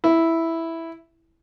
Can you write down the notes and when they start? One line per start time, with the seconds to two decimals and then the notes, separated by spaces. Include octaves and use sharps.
0.04 E4